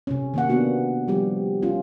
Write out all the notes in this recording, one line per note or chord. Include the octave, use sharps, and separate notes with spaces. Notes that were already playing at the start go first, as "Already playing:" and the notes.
C3 C#4
D#3 A#3 F#5
A#3 B3 D4 F#4
D#3 F3 G3 G4
C#4 F4